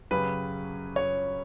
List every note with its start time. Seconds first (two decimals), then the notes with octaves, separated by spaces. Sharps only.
0.11 F#2 C#3 F#3 C#4 G4 B4
0.96 C#5